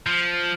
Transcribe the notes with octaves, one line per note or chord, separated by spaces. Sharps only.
F3